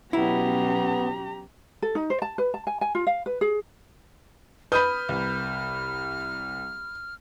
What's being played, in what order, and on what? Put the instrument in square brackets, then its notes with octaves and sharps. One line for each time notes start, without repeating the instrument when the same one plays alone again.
[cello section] B2 F#3 C#4 [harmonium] B3 [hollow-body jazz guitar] E4 [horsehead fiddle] G4 A#5
[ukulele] A4
D#4
C5
A5
B4
A5
G#5
G#5
F4
F5
B4
G#4
[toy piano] B4 [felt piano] B5 G6 [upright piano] D#6 D#7 [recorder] F6
[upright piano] C2